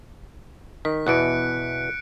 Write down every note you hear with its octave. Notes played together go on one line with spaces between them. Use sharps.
D#3 B6
E2 B2 E3 F#6 C#7 D7